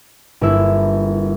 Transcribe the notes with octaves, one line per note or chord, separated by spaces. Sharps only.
G1 A#3 E4 E5